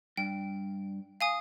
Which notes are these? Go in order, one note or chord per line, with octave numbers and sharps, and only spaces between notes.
G2 G5
F5 G#5 D#6